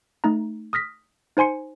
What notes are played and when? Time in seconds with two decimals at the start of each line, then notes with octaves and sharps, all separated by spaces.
0.24 A3 D#4 A#5
0.73 D#6 F6 A#6 B6
1.37 D#4 C5 G#5 C6 C#7